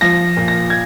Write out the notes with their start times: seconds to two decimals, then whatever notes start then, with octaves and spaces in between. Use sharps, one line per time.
0.01 F3 A#6
0.37 A#2
0.48 A#6
0.70 G#6